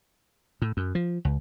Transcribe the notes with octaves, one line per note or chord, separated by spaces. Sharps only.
A2
F#2
F3
C#2